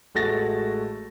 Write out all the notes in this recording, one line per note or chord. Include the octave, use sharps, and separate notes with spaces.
A1 G#3 A3 F#4 A6 A#6